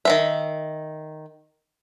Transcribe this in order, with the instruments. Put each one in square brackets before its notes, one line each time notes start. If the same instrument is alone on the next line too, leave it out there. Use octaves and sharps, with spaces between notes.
[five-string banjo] D#3 C4 E5